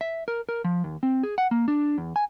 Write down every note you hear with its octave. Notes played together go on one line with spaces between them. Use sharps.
E5
A#4
A#4
F3
D#2
C4
G#4
F#5
A#3
D4
E2
G#5